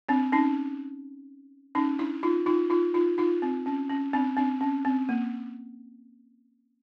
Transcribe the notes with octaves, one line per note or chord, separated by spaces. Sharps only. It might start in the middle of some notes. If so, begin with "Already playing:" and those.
C4 D4
C#4 D#4
C#4 D#4
D4 E4
D#4 F4
D#4 F4
D#4 F4
D#4 F4
D#4 F4
C4
C#4
C#4
C4 D4
C4 D4
C#4
C4
A#3